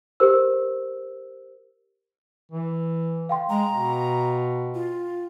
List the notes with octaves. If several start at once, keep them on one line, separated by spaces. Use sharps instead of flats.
G4 A#4 C5 E6
E3
F5 G5 C6
G#3 A#5
B2
F4